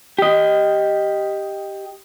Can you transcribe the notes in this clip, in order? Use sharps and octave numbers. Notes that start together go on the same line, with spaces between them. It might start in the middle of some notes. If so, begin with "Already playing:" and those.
G4 D#5